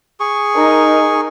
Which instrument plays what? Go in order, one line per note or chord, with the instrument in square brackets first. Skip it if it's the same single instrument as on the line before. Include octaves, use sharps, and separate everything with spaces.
[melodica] G#4 C#6
[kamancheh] D#4 A#4